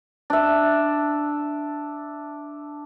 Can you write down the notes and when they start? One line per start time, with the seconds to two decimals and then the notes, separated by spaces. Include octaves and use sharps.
0.30 D4 E5